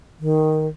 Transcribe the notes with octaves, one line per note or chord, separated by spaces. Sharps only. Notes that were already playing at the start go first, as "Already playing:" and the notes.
D#3